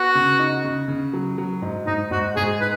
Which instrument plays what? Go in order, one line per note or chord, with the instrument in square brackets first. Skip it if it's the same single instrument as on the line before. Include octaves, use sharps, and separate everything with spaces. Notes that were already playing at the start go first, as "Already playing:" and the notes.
Already playing: [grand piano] B3 [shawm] F#4
[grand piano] C#3
D#4
C#3
C#3
F#3
F#3
G#2
[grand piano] G#2 [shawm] D#4
[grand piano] G#2 [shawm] F#4
[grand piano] G#2 [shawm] G#4
[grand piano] D#4 [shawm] B4